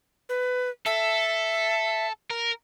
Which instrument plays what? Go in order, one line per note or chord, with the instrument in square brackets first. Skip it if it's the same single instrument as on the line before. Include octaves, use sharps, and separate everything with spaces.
[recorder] B4
[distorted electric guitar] A4 [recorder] E5
[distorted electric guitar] A#4